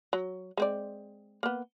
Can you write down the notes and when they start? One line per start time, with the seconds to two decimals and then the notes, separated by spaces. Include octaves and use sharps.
0.13 F#3
0.57 G#3 C4 D5
1.43 A#3 B3